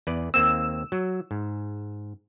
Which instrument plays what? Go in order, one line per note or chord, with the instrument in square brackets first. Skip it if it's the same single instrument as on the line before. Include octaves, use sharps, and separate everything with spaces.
[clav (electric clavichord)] E2 B4 D5
[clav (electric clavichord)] D#2 A#3 C4 [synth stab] E6
[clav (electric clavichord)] F#3
G#2